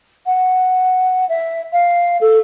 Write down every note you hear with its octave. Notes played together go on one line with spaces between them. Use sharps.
F#5
E5
F5
A4